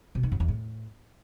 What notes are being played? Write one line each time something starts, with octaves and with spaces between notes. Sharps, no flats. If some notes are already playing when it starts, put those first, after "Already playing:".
B2
D#3
F#2
E2
A2